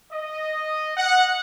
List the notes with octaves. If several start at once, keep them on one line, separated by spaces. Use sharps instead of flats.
D#5
F#5